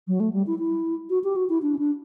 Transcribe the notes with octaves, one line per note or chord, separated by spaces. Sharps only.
F#3
A3
G3
E4
E4
F#4
G4
F#4
E4
D4
C#4
D4